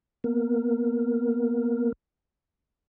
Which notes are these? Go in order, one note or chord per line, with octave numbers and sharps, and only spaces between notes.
A#3 B3 A#4